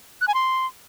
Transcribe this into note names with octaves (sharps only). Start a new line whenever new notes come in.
F#6
G#5
C6